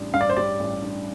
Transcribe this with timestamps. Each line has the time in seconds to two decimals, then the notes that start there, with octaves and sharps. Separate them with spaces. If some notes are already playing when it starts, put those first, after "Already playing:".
Already playing: A1 G3 D4
0.14 G2 F5
0.21 D5
0.30 C5
0.37 G3 D5
0.59 A1
0.82 D4